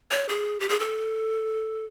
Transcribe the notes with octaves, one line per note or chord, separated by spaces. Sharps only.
C#5
G#4
G4
G#4
A4